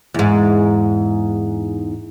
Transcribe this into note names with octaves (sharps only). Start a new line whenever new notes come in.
E2 G#2